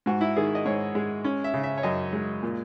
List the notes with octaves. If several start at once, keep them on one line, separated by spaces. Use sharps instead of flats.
G#2 F#4
E4
D#3 G#4
D#5
G#2 C#5
G#3
C#4
E5
C#3
E5
C#5
F#2 D#5
G#3
A#2